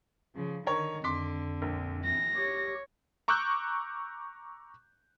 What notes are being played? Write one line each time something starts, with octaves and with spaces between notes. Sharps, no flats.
C#3 F3
D3 D#3 A#4 C#5 C#6
F2 D3 C6 D6 B6
A#1
E3 A#6
G4 C#5
A#5 C#6 D6 E6 F#6 G6